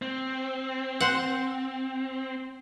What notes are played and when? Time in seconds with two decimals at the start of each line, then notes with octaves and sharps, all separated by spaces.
0.02 C4
1.00 C5 F#5